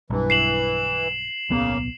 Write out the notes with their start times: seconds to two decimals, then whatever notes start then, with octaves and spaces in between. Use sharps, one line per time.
0.10 B1 G2 E3
0.30 C7 E7 F#7
1.50 D1 B1 C#3 A#3 B3